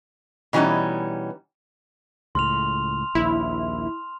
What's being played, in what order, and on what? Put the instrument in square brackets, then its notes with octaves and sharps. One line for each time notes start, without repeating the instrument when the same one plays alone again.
[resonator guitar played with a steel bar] B2 E3 G3 C#4 D#4
[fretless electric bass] C#2 A2 [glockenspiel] C6 F6 F7
[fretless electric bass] A#1 D#2 [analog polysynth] E4